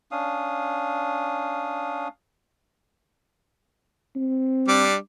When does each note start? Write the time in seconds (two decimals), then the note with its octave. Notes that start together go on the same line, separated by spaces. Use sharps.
0.11 C#4 D4 F5 D#6
4.16 C4
4.68 G3 D4 D6